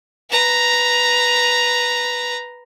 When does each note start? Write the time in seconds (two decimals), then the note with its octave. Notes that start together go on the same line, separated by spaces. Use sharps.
0.30 B4 A#5